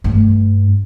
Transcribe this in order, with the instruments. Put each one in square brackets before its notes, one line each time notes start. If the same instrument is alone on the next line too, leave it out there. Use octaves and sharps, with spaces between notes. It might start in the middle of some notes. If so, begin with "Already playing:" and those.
[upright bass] G2 A3